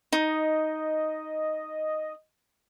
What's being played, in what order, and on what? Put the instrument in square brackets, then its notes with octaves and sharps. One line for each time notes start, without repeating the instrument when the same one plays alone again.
[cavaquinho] D#4 [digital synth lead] D#5